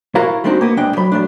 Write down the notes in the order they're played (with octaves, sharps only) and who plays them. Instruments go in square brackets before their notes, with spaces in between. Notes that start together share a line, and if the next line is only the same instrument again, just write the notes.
[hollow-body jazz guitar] E4 F#4 A#4 F5 A#5
G3 G#3 C4 D4 D#4 F#4
A#3 B3
C2 G#3 D4 G5
F#3 B5
F#3 A3 D4